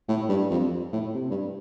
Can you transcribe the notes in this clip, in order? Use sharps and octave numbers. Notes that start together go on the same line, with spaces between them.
A2
G2
F2
A2
C3
G2